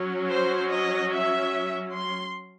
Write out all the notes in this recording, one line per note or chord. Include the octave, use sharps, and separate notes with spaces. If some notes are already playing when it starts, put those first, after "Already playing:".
Already playing: F#3 C#4
C5
D#5
E5
C6